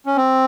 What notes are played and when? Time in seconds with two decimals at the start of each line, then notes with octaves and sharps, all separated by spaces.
0.06 C#4
0.17 C4